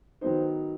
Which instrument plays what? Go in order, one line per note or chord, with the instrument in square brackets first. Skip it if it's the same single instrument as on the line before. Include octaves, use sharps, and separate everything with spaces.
[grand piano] D#3 F#3 B3 D#4 C5